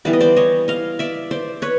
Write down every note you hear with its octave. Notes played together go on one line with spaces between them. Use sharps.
E3 G3 B3 D5
D#5
C5 D5
C#5 D#5
D#5 F5
D5 E5
C5 D5
B4 C#5